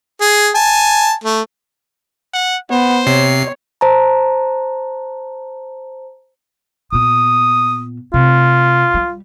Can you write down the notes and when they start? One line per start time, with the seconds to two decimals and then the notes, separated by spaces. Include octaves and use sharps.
0.21 G#4
0.55 G#5 A5
1.24 A3
2.33 F#5
2.71 B3 C5
3.07 C3 C#5 C7
3.81 C5 A5 A#5
6.92 A#2 B3 D#6
8.14 C3 F4
8.94 G3